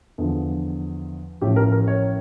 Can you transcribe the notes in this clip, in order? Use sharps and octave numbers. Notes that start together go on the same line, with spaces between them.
E2 D3 F3 A4
A1 A2 F3 G4
A#4
A#4
C#5